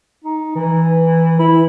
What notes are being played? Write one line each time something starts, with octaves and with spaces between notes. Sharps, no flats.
D#4
E3
E4